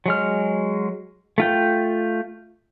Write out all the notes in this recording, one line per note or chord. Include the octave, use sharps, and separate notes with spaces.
F#3 G#3 F6
A3 F4 G5